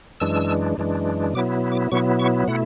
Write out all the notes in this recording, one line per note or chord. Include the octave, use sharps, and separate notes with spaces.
F#2 E3 G#3 D4 E6
F#2 E3 G#3 D4
B2 F#3 B3 E4 D6
D6
B2 F#3 B3 E4 C#6
C#6
B2 A3 E4 F#5